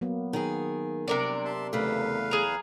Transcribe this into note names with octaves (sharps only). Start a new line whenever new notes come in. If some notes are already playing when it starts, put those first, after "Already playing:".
F#3 A#3 B3
D#3 G#4
C3 G3 D4 A#4 D5
E5 A5 C6
E2 C#3 A3 B4 F5
G#4 A#5